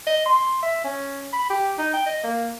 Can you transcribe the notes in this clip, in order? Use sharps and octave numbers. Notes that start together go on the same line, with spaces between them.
D#5
C6
E5
C#4
B5
G4
D#4
G5
D#5
A#3